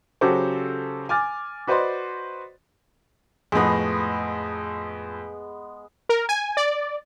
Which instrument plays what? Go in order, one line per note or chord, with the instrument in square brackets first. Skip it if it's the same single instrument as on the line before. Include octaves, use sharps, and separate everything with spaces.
[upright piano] C#3 F#3 F#4 G4 A4 C5
G#5 D6 F6 A6
F#4 B4 C5 D5 D#5 C6
[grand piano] F2 A2 [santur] G#3 B3
[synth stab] A#4
G#5
D5